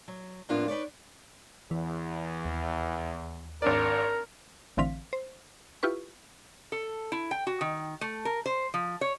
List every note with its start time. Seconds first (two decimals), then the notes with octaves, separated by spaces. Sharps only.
0.08 F#3
0.49 F2 A2 A#3 B3 D4 F4
0.68 D#4 B4 C#5 D5
1.71 E2 E3
2.45 D#2
3.62 G#1 D4 A#4 D5
4.77 A1 D3 E3 C4 F5 B6
5.13 C5
5.83 E4 F4 G4 B4 C#6
6.72 A4
7.12 E4
7.31 G5
7.47 F#4
7.61 D#3
8.01 A3
8.25 A#4
8.46 C5
8.74 F3
9.01 C#5